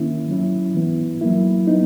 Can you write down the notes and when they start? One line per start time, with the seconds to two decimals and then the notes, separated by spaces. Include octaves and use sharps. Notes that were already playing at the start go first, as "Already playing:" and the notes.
Already playing: D#3 A#3 C#4 E4
0.29 F#3 C#4 E4
0.75 E3 B3 E4
1.21 F#3 A#3 E4
1.67 F#3 B3 D#4